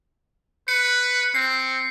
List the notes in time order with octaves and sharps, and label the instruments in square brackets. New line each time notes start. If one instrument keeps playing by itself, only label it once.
[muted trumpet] B4 [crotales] C#7
[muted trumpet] C4 [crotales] C7